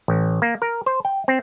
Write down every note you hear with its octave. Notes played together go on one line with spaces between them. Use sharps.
A1
A#3
A#4
C5
G5
C4